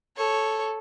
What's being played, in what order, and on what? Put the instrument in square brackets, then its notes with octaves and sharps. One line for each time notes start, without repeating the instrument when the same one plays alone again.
[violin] A4 [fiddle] C#5